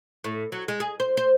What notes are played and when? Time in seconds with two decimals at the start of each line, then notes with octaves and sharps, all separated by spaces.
0.24 A2
0.52 F#3
0.68 G#3
0.80 G#4
1.00 C5
1.17 C5